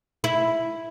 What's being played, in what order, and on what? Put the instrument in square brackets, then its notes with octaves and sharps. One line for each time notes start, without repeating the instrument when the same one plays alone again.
[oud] E4